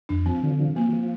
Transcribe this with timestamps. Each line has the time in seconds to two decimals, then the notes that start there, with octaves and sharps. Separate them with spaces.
0.09 F2 D4
0.26 F3 C4
0.43 D3
0.59 F3
0.76 F3 A#3
0.93 F3